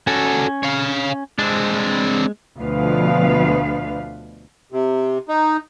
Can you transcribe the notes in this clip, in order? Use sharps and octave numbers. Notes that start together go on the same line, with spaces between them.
C#4 F#4 A4
C#5 F5
G#3 C4 D4
D2 B2 F3 B4 F5
C3
D#4